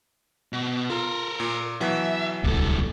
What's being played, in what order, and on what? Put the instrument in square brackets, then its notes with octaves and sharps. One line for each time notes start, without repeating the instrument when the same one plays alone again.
[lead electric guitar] B2
[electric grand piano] F4 [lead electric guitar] A4 A#4
[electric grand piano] A#2
[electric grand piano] B2 E3 F#3 [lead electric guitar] E5
[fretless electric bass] D1 C2 [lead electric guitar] A#2 A4